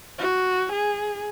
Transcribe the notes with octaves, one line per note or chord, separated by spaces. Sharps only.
F#4
G#4